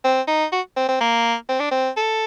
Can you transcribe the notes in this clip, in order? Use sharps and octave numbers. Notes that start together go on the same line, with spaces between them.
C4
D#4
F#4
C4
C4
A#3
C4
D4
C4
A4